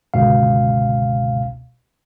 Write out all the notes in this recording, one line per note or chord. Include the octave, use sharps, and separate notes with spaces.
G1 C#2 B2 F5